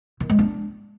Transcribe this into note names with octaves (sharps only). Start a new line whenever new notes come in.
D#3
G#3
D4